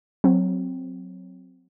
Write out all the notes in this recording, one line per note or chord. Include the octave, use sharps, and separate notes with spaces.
F#3 C4